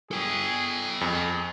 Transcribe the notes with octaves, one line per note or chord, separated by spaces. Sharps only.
G#4 A4 G5
F2 G#4